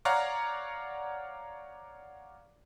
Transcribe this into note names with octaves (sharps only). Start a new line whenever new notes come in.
C#5 D5 F5 F#5 A#5